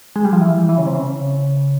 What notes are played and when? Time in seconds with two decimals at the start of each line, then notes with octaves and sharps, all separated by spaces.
0.16 G#3
0.25 G3
0.33 F3
0.41 E3
0.69 E3
0.78 C#3
0.87 C3
0.95 C#3